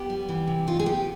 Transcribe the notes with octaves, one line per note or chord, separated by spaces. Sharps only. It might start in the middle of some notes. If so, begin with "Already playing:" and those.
Already playing: B3 G4
G3
E3
C3
D#4 F4
G#4
B3 G4